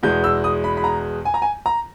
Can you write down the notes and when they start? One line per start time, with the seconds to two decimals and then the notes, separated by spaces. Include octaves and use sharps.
0.03 E2 B2 G#3 B3 G6
0.24 E6
0.44 D#6
0.64 B5
0.77 B5
0.84 A#5
1.25 G#5
1.34 A#5
1.42 G#5
1.66 A#5